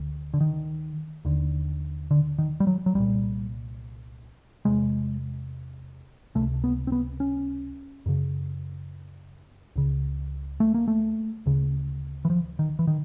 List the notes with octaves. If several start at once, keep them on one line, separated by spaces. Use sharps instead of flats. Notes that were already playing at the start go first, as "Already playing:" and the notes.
Already playing: D2 D3
D3
D#3
D#2 D3
D3
D#3
G3
F#3
F#3
C2 A#2 G3
E2 C3 G#3
C#2 C3 A3
B3
C4
B3
C#4
F#2 C#3
C#2 C#3
A3
A#3
A3
D2 C#3
E3
F3
D#3
E3
D#3